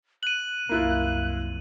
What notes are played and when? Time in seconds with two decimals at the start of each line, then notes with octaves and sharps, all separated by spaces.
0.23 F#6 D#7 F#7
0.69 C2 F#2 A#3 E4 F4